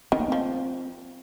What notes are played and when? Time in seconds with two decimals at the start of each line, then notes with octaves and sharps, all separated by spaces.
0.12 D#3 C4
0.20 A#3
0.28 F3 C4